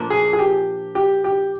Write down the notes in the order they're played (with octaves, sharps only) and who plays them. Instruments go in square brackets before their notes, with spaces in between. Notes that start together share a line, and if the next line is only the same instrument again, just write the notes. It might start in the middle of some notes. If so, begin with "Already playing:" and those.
Already playing: [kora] A#2 F3 A#3 D4
[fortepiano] G#4
G#4
G4
G4
G4